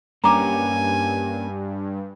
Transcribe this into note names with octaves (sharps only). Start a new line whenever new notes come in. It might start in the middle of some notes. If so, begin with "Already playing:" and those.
G2 A#3 C#4 G4 G#5 A#5 D6